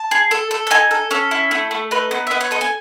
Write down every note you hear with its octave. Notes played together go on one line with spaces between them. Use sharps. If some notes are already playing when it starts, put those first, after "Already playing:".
Already playing: A5
G#4
A4
A4
A5
D#4 G#5
A4
C#4 A4
E4
A3
A3
D#4 B4
B3
E5
B3 D#5
C#5
A4 D#5
G#5